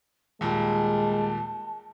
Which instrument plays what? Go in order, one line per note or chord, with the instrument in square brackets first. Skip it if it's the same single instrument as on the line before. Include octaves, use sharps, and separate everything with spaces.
[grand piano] D#2 A#2 G3 [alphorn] G#3 [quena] A5